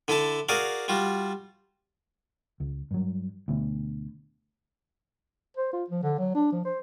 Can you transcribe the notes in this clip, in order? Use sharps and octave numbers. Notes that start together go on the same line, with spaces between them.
D3 E4 A4 A5
F#4 G#4 A#4 D5 F5
G3 F4 F#4
C#2
G2 F#3
D2 B2
C5
F4
F3
D3
F#3
D4
F3
C5